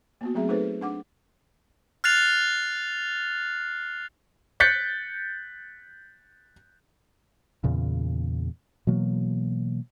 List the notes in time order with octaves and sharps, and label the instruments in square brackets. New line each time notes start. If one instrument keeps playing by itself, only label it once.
[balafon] A#3 B3 F#4
F#3 A3 C4 G#4 E5
A3 D#4 G#4 A4 B4 C5
D4 F#5 D6
[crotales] F6 F#6 A6 C7 F7
[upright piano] F#6 G6 A6 B6 C#7
[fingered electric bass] E2 A#2 C#3
B2 E3 F#3 A#3